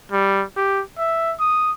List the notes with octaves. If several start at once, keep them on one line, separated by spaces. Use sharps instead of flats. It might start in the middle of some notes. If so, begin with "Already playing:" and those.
G3
G4
E5
D#6